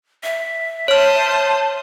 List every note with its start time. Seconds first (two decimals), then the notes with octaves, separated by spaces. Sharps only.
0.23 E5
0.88 C5 C#5 A5 D#6 F6